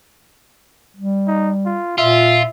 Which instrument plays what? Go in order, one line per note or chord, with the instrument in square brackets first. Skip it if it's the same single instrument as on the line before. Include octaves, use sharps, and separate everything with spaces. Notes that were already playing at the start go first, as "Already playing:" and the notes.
[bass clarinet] G3
[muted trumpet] D#4
F4
[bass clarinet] A#2 [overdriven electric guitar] F4 [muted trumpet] E5